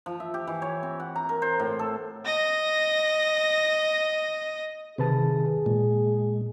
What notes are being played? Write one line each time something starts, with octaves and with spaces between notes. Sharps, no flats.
F3
E5
G4
E3
C#5
C4
F#5
A#5
A#4
C5
A2
A4
D#5 A#6
C3 D#3 G#4 B4 A5
A#2 G#3